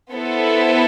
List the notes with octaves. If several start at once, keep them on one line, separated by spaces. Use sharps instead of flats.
B3 E4 A4 C5